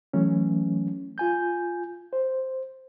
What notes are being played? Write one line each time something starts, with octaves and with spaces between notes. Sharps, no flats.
E3 F#3 A3 C#4
F4 G#5 G6
C5